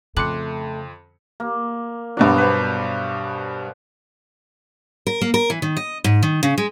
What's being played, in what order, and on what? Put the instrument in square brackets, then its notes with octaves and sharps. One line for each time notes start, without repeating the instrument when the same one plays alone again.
[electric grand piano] F2 C6 C#7 [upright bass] C#3 [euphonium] A3 [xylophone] D6 F#6 F#7
[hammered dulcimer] A#3
[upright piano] G2 B2 F#3 [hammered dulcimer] B3 D5
[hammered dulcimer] B4 C5
[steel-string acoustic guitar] A#4
A#3
A#4
E3
D#3
D#5
G#2
D#3
C#3
G#3